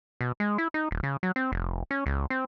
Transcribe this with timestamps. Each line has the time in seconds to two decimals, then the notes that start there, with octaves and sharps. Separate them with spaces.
0.21 B2
0.40 G#3
0.58 E4
0.74 D#4
0.91 D#1
1.03 C#3
1.23 F#3
1.36 C4
1.52 F1
1.91 C#4
2.06 C#2
2.30 C4